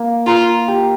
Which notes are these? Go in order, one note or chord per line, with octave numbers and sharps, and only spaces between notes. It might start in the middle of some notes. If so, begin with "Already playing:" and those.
Already playing: A#3
F4 A#4
G4